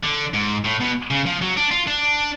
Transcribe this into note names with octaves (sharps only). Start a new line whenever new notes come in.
D3
G#2
A2
B2
C#3
F3
F#3
D4
F4
D4